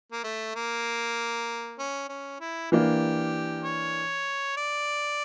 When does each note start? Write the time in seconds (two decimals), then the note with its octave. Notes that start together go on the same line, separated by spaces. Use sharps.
0.12 A#3
0.24 A3
0.55 A#3
1.79 C#4
2.09 C#4
2.40 E4
2.72 E3 A#3 D4 G4
3.64 C#5
4.57 D5